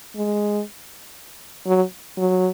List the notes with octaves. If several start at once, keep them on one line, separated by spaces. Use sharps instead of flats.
G#3
F#3
F#3